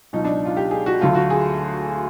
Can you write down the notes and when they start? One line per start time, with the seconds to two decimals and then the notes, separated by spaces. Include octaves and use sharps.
0.13 C#2 B2 F#3 D#4
0.25 D4
0.45 F4
0.57 G4
0.71 G#4
0.86 F#4
1.01 D2 D3 F#3 A3 F4
1.15 F#4
1.30 G#4